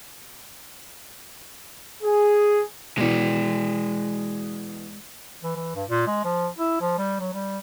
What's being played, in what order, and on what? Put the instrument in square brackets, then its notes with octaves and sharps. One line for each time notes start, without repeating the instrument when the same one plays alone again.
[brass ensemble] G#4
[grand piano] B2 E3 [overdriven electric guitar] G#3 D5
[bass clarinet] E3
E3
G2
A#2
G#3
F3
E4
F3
G3
F#3
G3